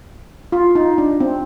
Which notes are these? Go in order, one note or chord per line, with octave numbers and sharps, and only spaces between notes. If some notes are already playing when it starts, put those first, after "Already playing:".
F4
D#4
D4
C4